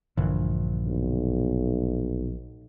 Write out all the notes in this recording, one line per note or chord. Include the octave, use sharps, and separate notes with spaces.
A#1 G2 D3 E3
B1